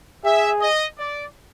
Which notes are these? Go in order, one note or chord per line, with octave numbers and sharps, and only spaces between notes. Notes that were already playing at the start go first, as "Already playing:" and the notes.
G#4 E5
D#5
D5